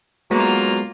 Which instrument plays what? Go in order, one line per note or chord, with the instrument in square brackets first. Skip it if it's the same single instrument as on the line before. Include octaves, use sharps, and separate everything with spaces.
[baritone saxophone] F#3 [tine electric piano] G#3 B3 [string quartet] A#3 F4